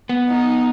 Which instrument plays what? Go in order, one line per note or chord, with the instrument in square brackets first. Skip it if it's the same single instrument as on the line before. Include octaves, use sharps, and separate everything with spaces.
[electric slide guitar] B3
[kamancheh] D#4